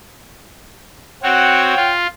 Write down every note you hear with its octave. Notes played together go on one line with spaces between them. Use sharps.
C4 F#4 C#5 F#5 G5
F4